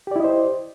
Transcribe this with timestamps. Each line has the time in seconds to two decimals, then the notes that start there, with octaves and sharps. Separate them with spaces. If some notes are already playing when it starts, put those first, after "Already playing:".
0.07 G4
0.11 D5
0.16 E4
0.20 D#5
0.24 C5